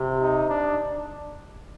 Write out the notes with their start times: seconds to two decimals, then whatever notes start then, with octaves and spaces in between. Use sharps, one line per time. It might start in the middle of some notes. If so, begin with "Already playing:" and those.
Already playing: C3
0.20 D#4
0.50 D4